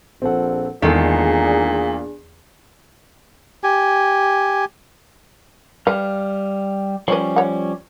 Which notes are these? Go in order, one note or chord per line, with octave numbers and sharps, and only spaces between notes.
A#1 C4 A4 F#5
E2 A#2 D#3 G#3 D4 G#4 A4
G4 G#5
G3 B4 F5
F3 G3 C#4 B4 C#5
C#5 F#5